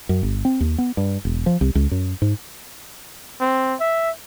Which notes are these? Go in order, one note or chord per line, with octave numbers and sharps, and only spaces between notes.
F#2
G1
C4
D#2
B3
G2
E1
F3
C2
C#2
F#2
G#2
C4
E5